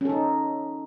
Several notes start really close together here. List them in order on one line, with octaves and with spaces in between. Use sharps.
C#4 A4 D#4